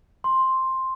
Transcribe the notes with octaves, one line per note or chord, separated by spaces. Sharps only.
C6